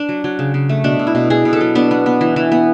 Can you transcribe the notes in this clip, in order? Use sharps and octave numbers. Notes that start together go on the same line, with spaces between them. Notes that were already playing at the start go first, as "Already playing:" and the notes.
Already playing: D4
F#3
F#3
C#3
C#3
A3
B2 D4
B2
E4
B2
B2 G#4
B2
A4
F#3
B3 D4
B3
B3
E3
E3
B3